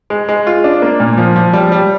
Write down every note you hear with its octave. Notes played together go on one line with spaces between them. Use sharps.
G#3
G#3
F4
D4
A#3
A#2
F3
F3
G3
G3